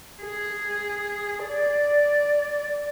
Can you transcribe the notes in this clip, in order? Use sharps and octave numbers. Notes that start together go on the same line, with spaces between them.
G#4
D5